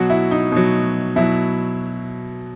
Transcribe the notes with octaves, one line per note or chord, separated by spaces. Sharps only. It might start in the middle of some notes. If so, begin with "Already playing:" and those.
Already playing: B2 F#3 F#4
E4
D#4
B2 F#3
B2 F#3 E4